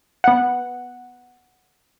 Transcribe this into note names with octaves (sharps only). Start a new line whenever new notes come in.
B3 F#5